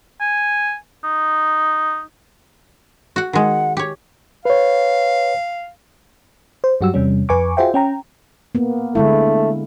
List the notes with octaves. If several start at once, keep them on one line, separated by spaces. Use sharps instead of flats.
G#5
D#4
F#4 F#5
D#3 G#3 F#5
G4 C#5
B4 C#5 F5
C5
G2 F#3 F#4 G4 E6
E2 C3 G3 C#4
F2 B4 G#5 C#6 D6
F4 F#4 G#4 C5 E5 G5
C#4 G5 A#5
A#3 B3
D3 G#3 A3 E4